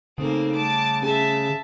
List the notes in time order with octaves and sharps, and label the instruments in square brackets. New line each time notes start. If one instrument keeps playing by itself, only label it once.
[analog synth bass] C#3 [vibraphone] A3 D#4 A4 [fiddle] A#3 C4
[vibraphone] G3 A3 [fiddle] A5 D6
[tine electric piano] C#4 G#4 [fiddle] E5 A5